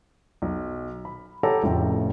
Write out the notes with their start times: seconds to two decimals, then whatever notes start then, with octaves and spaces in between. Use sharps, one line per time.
0.42 B1
1.05 B5
1.43 G4 A4 C#5 F#5 A5 A#5
1.63 F1 A2 C#3 F4 G5